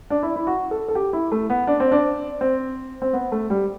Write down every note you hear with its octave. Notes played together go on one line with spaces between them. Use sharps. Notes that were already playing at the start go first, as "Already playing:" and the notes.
D4
E4
E4
F#4
A4
A4
G4
E4
A3
B3
D4
C4
D4
C4
C4
B3
A3
G3